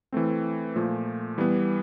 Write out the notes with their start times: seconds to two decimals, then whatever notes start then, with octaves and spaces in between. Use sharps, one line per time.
0.12 E3 A3 C4
0.76 A#2 F3 A3
1.38 E3 G3 B3